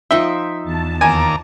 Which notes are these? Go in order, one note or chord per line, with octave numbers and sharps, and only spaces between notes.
F3 D#4 E5 G5
E2 A5
D#2 G#5 A#5 D6